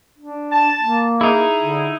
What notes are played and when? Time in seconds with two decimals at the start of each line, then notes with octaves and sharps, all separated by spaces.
0.18 D4
0.52 A5
0.81 A#3
1.21 D#4 E4 G#4
1.62 D3